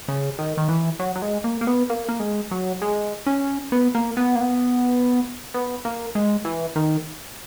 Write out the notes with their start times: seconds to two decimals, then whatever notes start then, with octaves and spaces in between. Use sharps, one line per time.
0.08 C#3
0.39 D#3
0.57 D#3
0.69 E3
1.00 F#3
1.16 F#3
1.22 G#3
1.44 A#3
1.61 A#3
1.67 B3
1.90 A#3
2.09 A#3
2.20 G#3
2.51 F#3
2.82 G#3
3.26 C#4
3.72 B3
3.95 A#3
4.17 B3
4.35 A#3
4.40 B3
5.54 B3
5.85 A#3
6.15 G#3
6.45 E3
6.75 D#3